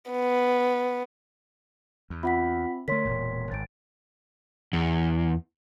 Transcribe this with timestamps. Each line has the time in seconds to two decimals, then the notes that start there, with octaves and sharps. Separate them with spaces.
0.11 B3
2.10 E2
2.23 C4 F4 E5 F#5 B5 B6
2.88 D3 A3 A#4 C#5 C6 B6
3.05 E1 A#2
3.51 G#1 A6 D7
4.73 E2